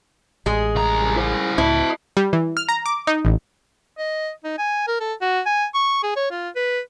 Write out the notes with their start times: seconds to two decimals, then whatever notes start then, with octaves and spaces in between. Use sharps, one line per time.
0.46 A1 G#3 G#4
0.75 C2 A#5
1.16 E4 C5
1.58 C#2 A2 E4 D#5 A5
2.17 G3
2.33 E3
2.57 F6
2.69 A#5
2.86 D6
3.07 D#4
3.25 A1
3.98 D#5
4.44 D#4
4.58 G#5
4.87 A#4
5.00 A4
5.21 F#4
5.46 G#5
5.74 C#6
6.03 G#4
6.16 C#5
6.31 F4
6.56 B4